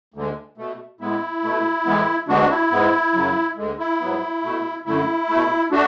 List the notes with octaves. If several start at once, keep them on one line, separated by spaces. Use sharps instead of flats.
D2 D3 G#3
B2 A3
A2 G#3 B3 E4
B2 A3
A2 E3 G#3 B3
D2 D3 G#3 B3 D4 F#4
E4
G#2 G#3 B3
F#2 C#3 F#3
D2 D3 G#3
E4
G#2 F#3 B3
B2 A3
F#2 D3 A3 E4
B2 A3
A3 D4 F#4